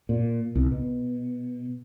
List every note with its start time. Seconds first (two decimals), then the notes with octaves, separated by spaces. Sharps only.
0.09 A#2
0.55 C2
0.72 B2